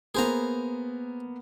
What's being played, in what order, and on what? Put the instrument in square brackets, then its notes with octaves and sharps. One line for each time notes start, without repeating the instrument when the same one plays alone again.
[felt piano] A#3 B3 [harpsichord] G#4 C5 A#5